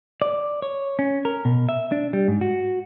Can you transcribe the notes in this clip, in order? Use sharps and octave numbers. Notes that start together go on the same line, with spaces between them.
D5
C#5
C#4
A#4
B2
E5
D4
G3
G#2
F#4